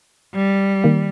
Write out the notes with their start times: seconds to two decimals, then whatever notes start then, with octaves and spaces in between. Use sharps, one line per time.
0.34 G3
0.84 D#3 A#3